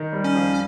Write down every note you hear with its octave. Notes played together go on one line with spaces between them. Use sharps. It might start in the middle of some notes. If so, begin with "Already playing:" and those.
Already playing: D#3
G3
C#4
F2